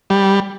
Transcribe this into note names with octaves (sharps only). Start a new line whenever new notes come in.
G3